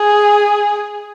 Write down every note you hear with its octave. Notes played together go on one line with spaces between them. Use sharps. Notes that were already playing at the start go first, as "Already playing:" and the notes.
Already playing: G#4